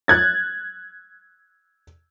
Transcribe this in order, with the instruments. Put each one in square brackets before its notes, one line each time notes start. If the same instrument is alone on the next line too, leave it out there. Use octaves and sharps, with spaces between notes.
[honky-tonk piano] F#6 G#6 A6